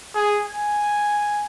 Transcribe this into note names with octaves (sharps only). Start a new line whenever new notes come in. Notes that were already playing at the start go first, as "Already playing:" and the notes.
G#4
G#5